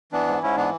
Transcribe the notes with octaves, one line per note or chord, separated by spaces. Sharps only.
E3 B3 D4
G#2
G#2 C#4 E4
E3 B3 D4